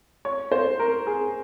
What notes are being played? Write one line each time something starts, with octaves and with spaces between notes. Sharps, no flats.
C#5
C5
A#4
G#4